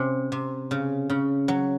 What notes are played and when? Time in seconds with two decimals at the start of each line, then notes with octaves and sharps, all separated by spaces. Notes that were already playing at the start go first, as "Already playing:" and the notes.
Already playing: C3 C#4
0.32 C3
0.71 C#3
1.10 C#3
1.48 F#3